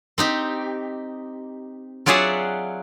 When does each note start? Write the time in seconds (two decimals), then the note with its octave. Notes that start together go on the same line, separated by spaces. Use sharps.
0.18 C4 D#4 G4
2.06 F#3 F4 G#4 D5 E5 F#5